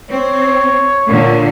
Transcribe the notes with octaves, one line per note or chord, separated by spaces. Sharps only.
C4 C#5
A#2 D3